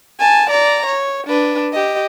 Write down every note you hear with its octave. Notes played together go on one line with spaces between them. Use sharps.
G#5 A5
D5 A#5
C#5
D4 B4
G4 D#5